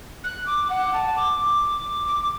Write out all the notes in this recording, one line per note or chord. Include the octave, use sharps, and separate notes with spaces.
F#6
D6
F#5
A5
D6
D6